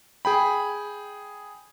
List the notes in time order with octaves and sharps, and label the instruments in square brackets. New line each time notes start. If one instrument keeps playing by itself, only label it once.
[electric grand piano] G#4 G5 B5